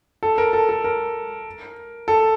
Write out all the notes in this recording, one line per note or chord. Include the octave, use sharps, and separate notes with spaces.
A4
A#4
A4
A4
A#4
A4